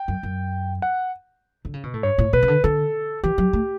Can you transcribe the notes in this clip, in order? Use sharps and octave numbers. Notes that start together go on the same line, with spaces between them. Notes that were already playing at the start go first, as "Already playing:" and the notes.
Already playing: G5
F#2
F#2
F#5
D3
C#3
B2
A2
G2 C#5
A2
B2 B4
C#3
D3
D3 A4
E3 G4
F#3
A3